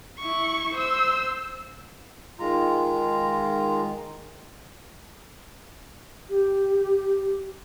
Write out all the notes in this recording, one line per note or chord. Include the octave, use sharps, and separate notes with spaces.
E4 C#6
C5 E6
D#3 G#3 F4 A#5
G4